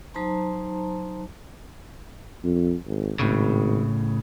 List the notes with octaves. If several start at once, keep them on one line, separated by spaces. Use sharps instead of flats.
F#3 D#4 C5 A5 A#5 C6
F2
G#1
G#1 A2 C#3